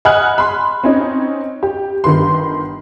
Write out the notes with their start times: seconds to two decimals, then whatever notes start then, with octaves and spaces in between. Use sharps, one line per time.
0.05 D#5 F#5 G#5 B5 F6 F#6
0.38 B5 C6
0.84 C4 C#4 D#4
1.63 G4
2.04 G1 D#3 B4 C6